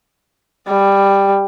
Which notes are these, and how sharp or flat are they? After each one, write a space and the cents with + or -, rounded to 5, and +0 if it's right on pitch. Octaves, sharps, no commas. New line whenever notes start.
G3 +10